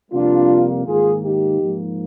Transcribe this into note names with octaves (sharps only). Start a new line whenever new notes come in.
F2 C3 G3 A#3 D4 F4
G#2 D#3 A#3 F4 G#4
D#4 G4
G#2 F3 A#3